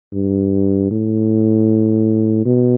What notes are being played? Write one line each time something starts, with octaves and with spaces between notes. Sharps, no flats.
G2
A2
B2